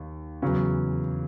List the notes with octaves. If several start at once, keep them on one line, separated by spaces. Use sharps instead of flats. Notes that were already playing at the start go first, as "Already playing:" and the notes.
Already playing: D#2
E2 C#3 F#3 C#4